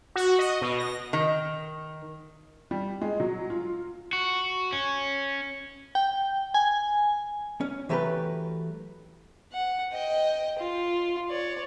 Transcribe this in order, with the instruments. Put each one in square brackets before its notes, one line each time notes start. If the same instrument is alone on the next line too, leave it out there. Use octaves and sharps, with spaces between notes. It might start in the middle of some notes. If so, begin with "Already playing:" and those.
[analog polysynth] F#4
D#5
B2
A#6
[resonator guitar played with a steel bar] D#3
[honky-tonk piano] G3
G#3
F#3
F4
[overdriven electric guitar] F#4
C#4
[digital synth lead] G5
G#5
[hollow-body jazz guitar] C#4
E3 F#3 A3 G4 A#4 B4
[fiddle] F#5
D#5 G5
F4
C#5 D5